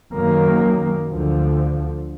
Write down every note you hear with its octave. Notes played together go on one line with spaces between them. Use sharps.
F#2 D#3 F#3 A#3
D2 D3 F3